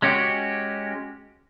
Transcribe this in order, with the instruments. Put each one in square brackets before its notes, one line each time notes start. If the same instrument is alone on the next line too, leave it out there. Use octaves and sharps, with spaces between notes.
[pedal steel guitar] G#3 C#4 F#4 G4